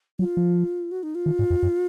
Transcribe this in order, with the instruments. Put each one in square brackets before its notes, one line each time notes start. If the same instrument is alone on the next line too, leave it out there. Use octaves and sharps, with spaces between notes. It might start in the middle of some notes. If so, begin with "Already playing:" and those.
[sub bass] F#3 [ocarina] F4
[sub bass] F3
[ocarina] F#4
D#4
F4
[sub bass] D#3
G#2
F2
F#2